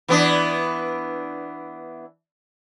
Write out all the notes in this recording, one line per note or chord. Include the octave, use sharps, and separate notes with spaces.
E3 B3 D4